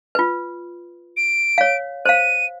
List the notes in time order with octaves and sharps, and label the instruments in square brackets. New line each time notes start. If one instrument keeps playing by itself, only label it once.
[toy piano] F4 B4
[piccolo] D7
[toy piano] C#5 F5
[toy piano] C5 F5 [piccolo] D#7